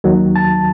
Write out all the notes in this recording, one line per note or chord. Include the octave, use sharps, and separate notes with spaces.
D#2 D#3 F#3
A5